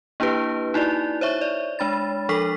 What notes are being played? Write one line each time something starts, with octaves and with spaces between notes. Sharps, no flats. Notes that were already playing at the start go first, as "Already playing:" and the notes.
A#3 D4 E4 G4 B4
D#4 E4 F#4 D5
C5 C#5 E5 C#6
D5
G#3 D4 B5 A6
F3 D4 A4 C#6 B6